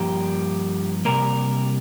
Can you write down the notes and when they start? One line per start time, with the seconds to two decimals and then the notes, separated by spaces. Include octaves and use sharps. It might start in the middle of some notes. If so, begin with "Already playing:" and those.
Already playing: G2 F3 A#3 G4
1.05 C3 G3 A#3 A#4